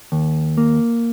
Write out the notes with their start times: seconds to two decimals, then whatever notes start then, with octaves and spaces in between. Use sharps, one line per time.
0.12 D#2
0.58 A#3